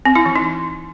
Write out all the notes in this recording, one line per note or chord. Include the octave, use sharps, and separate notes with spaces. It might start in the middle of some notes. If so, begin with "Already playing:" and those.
C4
E4
E3
D#4